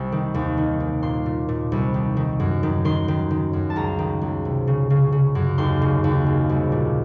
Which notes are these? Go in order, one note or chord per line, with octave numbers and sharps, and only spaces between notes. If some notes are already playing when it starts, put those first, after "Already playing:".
Already playing: C2
D#3
D#2
D#3
D#3
A#2 C6
A#2
A#2
C2
D#3
D#3
F#2
D#3
D#3 C6
D#3
D#3
F#2
A5
C#2 A#5
D#3
C#2
C3
C#3
C#3
C#3
F#2
D#2 C6
C#3
D#2
C#3
C2
A#2